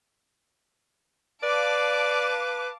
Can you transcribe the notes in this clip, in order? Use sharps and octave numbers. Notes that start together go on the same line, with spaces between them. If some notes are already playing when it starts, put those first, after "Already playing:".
B4 D5 F5 A5 D6